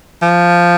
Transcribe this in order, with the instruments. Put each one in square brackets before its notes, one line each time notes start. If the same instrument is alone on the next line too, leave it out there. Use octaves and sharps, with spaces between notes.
[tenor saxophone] F3